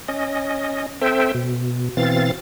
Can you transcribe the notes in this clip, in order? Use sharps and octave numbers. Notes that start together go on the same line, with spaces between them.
C#4 D#5
C4 A4 C5 E5 G5
B2
B2 E3 C4 F5 A6